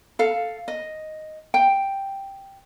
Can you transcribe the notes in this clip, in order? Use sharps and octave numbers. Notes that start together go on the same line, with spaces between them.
A4 F5
D#5
G5